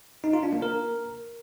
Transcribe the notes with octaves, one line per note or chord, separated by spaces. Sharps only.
D#4
F4
D4
A#3
A#4